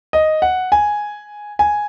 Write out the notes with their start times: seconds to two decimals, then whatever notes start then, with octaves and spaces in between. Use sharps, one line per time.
0.13 D#5
0.42 F#5
0.72 G#5
1.59 G#5